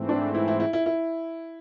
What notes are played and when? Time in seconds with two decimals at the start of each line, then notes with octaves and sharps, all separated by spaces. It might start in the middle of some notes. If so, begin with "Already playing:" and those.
Already playing: G#2 E3 A3 C4
0.09 D4
0.35 E4
0.48 E4
0.60 E4
0.73 E4
0.86 E4